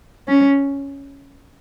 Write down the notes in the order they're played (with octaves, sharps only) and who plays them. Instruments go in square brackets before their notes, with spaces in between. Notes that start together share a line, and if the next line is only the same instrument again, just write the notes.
[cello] C#4